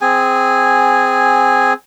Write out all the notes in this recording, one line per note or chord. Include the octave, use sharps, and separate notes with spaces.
C4 G#4 G#5